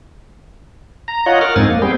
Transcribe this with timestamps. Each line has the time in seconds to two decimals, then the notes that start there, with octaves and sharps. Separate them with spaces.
1.08 A#5
1.26 F4 C#5 D#5 F#5
1.41 A#4 F#5 F6
1.56 F2 G#2 C4 D#4 G#5 A6
1.69 A#3
1.82 G3 B3 C4 G#4 G5